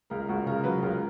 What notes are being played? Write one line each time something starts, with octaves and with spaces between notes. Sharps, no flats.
C#2 A#4
C#2 F#4
C#3 A#4
F#3 B4
C#2 A#4